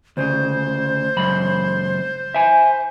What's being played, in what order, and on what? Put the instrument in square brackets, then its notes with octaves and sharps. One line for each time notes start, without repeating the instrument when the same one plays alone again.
[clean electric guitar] D2 C#3 [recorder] C5
[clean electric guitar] C#2 F#2 B5
E5 G#5